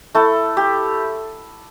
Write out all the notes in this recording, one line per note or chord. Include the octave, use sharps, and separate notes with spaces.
A3 E4 A4
G4